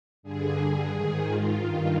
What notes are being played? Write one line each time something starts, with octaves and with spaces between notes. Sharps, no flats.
G2 D3 G#4
G#2 D#3
F4
G2 D#3